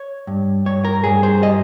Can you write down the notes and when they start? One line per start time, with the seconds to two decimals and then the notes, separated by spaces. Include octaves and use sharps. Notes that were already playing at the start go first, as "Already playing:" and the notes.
Already playing: C#5
0.27 G2
0.66 G2 C#5
0.85 A#4
1.04 G2 G#4
1.23 C5
1.42 G3 D#5